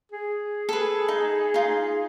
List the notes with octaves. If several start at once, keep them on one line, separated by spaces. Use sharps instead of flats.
G#4
A4 B4
D#4
D#4 F4